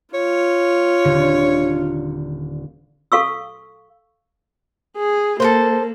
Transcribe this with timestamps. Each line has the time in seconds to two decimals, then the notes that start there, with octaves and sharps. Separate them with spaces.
0.14 F4 C#5
1.04 D#1 D3
3.12 A4 F5 C#6 E6
4.97 G#4
5.40 A#3 A4 B4 C5